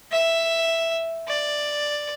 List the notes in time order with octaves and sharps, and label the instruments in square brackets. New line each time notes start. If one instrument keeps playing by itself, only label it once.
[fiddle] E5
D5